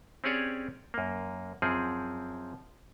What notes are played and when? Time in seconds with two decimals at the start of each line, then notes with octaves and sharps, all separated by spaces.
0.24 C4 C#4 G4 G#4 C#5 D5
0.94 F#2 A#3
1.62 F#2 F3 C4 G#4